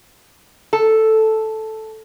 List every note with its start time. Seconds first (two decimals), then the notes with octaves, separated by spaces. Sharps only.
0.73 A4